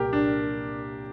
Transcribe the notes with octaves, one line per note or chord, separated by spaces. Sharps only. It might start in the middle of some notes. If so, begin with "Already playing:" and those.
Already playing: C2 A#2 G4 A#4
D4